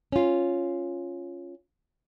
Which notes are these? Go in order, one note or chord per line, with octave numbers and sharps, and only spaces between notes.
C#4 F4